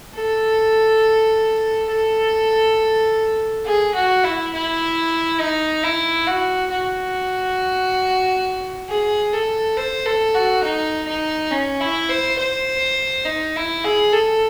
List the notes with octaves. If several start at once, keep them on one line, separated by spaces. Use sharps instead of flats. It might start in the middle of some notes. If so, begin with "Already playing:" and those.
A4
A4
G#4
F#4
E4
E4
D#4
E4
F#4
F#4
G#4
A4
C5
A4
F#4
D#4
D#4
C#4
E4
C5
C5
D#4
E4
G#4
A4